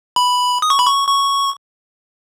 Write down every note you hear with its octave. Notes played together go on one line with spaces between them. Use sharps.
B5
D#6
C#6
B5
C#6
C#6